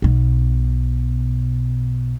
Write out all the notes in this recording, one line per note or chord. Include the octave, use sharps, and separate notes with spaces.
B1 B2